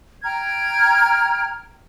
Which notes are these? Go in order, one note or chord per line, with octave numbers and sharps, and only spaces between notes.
G5 A#5 F6 G#6